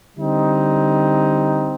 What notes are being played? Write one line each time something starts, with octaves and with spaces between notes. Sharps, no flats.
D3 G3 C4 D#4